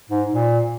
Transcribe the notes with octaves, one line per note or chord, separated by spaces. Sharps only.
G#2
A#2